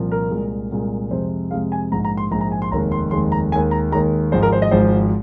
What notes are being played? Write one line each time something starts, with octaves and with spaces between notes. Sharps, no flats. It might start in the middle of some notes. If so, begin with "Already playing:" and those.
Already playing: C2 A#2 F3
A#4
C2 A#2 G#3
C2 A#2 G#3
F2 C3 G#3 C5
F2 C3 G#3 F5
G#5
A#1 G#2 G#3 A#5
A#5
C6
A#1 G#2 G#3 A#5
A#5
G#5
C6
F1 D#2 D#3 G#3 A#5
C6
F1 D#2 D#3 G#3 C6
A#5
D#2 D#3 G#3 G#5
A#5
D#2 D#3 G#3 A#5
G#1 G#2 F3 G#3 C5
A#4
C5
D#5
G#1 G#2 F3 G#3 C5